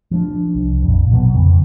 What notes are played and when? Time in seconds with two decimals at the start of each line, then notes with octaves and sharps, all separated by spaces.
0.11 F3 D4
0.55 C2
0.83 A#1 F2
1.11 B2 F#3 A3 B3
1.35 F2 C#3